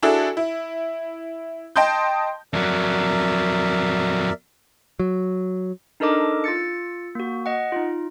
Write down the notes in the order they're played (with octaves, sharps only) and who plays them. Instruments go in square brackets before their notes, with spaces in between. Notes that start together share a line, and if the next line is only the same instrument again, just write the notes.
[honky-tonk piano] D4 E4 F#4 G#4 A4
E4
D#5 G5 A5 C6 D#6 G6
[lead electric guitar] F2 F#3 [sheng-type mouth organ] A#4 D5 E5
[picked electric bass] F#3
[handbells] D4 D#4 A4 A#4 D#5 D6
F4 E6 A6 C#7
A#3 F#4
D#5 F#5
D#4 F4